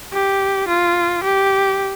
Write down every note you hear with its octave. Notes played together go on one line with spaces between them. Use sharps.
G4
F4
G4